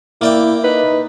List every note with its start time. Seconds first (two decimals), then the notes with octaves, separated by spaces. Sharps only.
0.22 A#3 E4 D5 G5
0.64 D#4 B4